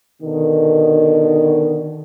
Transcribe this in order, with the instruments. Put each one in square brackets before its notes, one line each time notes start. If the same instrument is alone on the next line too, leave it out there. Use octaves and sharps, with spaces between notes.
[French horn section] B2 D3 D#3